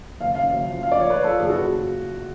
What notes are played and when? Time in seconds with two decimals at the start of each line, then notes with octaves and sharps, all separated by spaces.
0.21 F#1 F5
0.35 F#2 F5
0.51 F#1
0.65 F3
0.80 F3 F5
0.92 F3 D5
1.00 C#5
1.09 F3 B4
1.24 F3 A4
1.39 F#1 G#4
1.50 F#4